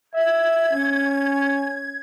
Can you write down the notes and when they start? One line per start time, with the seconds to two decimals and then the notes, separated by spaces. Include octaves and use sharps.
0.14 E5 G#6
0.71 C#4